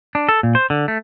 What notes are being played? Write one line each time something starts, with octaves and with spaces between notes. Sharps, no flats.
D4
A4
A#2
C5
D3
A3